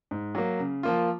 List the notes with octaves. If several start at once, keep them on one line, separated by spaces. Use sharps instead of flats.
G#2
F#3 A#3
C#3
F3 A#3 F4